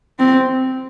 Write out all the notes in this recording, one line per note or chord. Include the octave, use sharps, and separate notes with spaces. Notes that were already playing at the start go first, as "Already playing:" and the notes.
C4